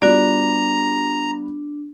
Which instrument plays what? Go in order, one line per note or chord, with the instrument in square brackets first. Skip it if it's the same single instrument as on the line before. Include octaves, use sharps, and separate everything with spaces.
[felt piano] G3 B3 F4 [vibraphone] D4 [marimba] F#4 D5 [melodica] A#5